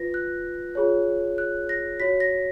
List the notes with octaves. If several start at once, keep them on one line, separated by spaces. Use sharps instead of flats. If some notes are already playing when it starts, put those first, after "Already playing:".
Already playing: F4 B4 A#6
F#6
F4 G#4 C#5
F#6
A#6
F#4 C#5 B6
A#6